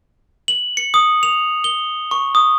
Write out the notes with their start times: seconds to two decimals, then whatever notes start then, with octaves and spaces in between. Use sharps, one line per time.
0.48 F#7
0.77 C#7
0.94 D#6
1.23 F7
1.64 G7
2.11 C#6
2.35 D#6